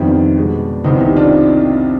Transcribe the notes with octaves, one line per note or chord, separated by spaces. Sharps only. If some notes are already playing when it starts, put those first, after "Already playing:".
Already playing: F2 C3 D#3 G3 B3 D4
B2 G#3 B3
C2 C3 D#3 B3 C4 D#4
D#4 G4
D4 F4